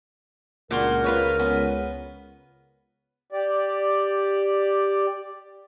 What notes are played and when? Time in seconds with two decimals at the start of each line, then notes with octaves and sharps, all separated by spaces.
0.71 C#2 A#2 D4 F#4 A#4 C6
1.04 F4 B4 C#5
1.39 B3 C#4 F5
3.32 G4 D5